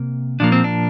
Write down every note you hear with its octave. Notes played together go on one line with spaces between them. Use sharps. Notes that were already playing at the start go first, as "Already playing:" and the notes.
Already playing: C3 A#3
A#2 F3 A#3 D4
C4
D4